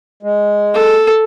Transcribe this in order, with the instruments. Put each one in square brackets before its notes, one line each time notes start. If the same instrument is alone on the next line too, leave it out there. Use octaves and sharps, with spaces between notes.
[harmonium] G#3
[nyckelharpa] A4